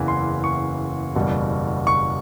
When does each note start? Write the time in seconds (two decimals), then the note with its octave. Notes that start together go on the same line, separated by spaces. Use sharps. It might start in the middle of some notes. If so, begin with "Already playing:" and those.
Already playing: F#1 E2 C#3 E3
0.08 C6
0.44 C#6
1.16 F#1 E2 B2 G3
1.87 C#6